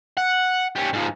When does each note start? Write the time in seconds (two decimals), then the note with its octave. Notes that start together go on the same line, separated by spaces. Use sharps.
0.17 F#5
0.76 G3 C#4
0.93 G#2 F3